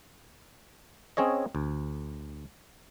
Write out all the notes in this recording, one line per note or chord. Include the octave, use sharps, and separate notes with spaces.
C4 C#4 G#4 C#5 D#5
D2